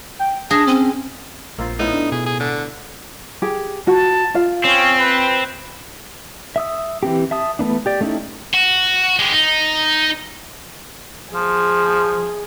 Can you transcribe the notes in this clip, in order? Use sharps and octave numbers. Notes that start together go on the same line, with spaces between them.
G5
D4 G#4 A#6
C4 C#4
C4
A#1 A#3 C4 F4
A2 B3 D#4
D4
B2 G#4
G#4
D3
G4 G#4
F#4 A5
F4 F5
C4 C#4
B4
E5 D#6 E6
E3 C4 G4
E5 A5 D#6
E3 A3 B3 D4
G4 D5
A3 C#4 D#4 E4 G4
F#4
G#3 G4
D#4
F3 G#4